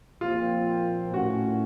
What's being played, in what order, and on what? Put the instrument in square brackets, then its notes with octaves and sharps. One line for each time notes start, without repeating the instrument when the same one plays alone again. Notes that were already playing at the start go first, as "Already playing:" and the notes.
[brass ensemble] A#2 F3 C4 [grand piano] F4
[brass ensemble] A2 A3 C#4 [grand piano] F#4